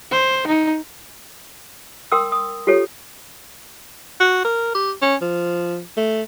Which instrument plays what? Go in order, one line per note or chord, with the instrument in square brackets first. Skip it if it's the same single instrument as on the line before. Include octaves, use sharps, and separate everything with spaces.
[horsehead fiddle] C5
D#4
[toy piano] A#4 G5 C6 D#6 E6
D#6
F4 G4 A4 C#5
[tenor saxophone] F#4
A#4
G4
C#4
F3
A3